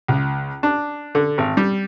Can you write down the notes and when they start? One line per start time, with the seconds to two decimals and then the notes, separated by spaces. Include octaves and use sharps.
0.08 C#2
0.63 D4
1.15 D3
1.38 G#1
1.57 G3